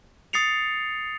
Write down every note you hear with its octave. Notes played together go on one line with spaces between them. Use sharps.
D#6 A6 C7 C#7 F7